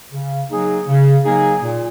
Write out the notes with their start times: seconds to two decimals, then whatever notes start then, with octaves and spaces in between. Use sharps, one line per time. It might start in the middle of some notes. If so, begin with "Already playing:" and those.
0.12 C#3
0.50 F#3 A#3 D#4 G#4
0.87 C#3
1.25 F#3 A#3 D#4 G#4
1.63 A#2